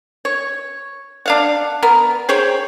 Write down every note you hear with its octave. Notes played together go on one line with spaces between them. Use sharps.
C#5
D4 F5 F#5
B3 A#4
G#4 C5 C#5 G5